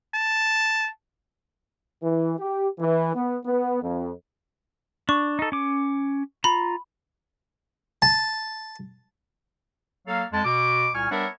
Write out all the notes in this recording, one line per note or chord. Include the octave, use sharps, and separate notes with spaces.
A5
E3
G4
E3
B3
B3
F2
D4 C#6
D#4 A4
C#4 D6
F4 A#5 B5
A5
F#3 A#3 A4 F5
F2 G#3 A5
B2 D6
C2 A#2 G#5 C#6 F6
G3 B3 D4 A#4 C#5 E5